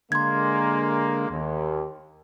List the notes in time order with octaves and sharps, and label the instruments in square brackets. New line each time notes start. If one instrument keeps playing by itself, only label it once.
[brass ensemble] D3 G#3 A#3 [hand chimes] C6 G#6
[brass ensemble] D#2